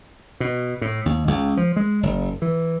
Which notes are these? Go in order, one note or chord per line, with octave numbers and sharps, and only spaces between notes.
B2
A2
D#2
C#2
F3
G#3
F#1
E3